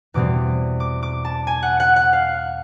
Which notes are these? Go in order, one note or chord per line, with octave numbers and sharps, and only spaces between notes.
E2 B2 G3 C4 D6
D6
D6
A5
G#5
F#5
F#5
F#5
F5